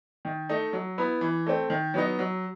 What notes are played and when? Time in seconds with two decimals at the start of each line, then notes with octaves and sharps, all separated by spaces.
0.25 D#3
0.49 A3 D#4
0.73 F#3
0.98 B3 E4
1.21 E3
1.46 A3 C4
1.70 D#3
1.94 F#3 B3 D#4
2.19 F#3